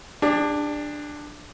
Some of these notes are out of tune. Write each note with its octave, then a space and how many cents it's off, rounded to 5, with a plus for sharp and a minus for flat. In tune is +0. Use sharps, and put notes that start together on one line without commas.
D4 +10 G#4 -45